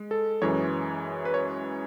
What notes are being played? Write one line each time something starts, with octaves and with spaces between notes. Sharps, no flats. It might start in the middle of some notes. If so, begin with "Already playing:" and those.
Already playing: G#3
A4
F#2 E3 G#3 C#5
B4
C#5